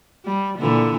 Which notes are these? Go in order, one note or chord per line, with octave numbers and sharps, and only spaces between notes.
G3
A#2 D3 E3